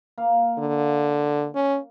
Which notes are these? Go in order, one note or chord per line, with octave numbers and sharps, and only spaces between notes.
A#3 F5
D3
C#4